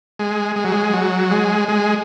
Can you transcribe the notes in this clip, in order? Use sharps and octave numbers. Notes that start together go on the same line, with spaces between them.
G#3
G#3
F#3
G#3
F#3
G#3
G#3